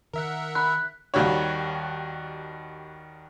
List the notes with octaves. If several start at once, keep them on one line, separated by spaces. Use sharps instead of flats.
D#3 A#4 E5 F#5
B5 F#6
D#2 D#3 G3 F#4 C#5